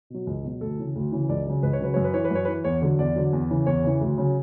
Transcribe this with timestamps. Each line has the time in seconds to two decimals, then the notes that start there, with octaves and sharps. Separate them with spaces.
0.10 B2 F#3
0.27 C#2
0.44 B2 F#3
0.61 D2 A4
0.78 C#3 E3
0.95 D2
1.12 C#3 E3
1.29 C#2 D5
1.46 C#3 F#3
1.63 C#2 B4
1.73 C#5
1.80 C#3 F#3 B4
1.94 F#2 C#5
2.04 B4
2.14 E3 C#5
2.25 B4
2.31 F#2 C#5
2.45 B4
2.48 E3
2.64 E2 C#5
2.82 D3 F#3
2.99 E2 D5
3.16 D3 F#3
3.33 E2
3.50 C#3 E3
3.66 E2 C#5
3.84 C#3 E3
4.01 D2
4.18 C#3 F#3